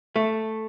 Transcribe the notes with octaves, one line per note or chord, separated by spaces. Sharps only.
A3